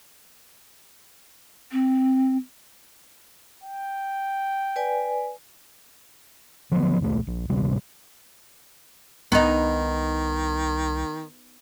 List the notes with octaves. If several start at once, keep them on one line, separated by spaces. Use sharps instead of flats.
C4
G5
B4 D5 G#5
D3 F3 F#3 B3
D#1 B1 A3
A#1
D1 G#1 C3 G3
C2 D#3 B3 D#4